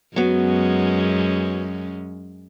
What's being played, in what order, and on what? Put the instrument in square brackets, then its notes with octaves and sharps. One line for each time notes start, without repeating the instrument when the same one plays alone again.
[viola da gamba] F#2 G#3 C#4 [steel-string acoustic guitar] F#3 B3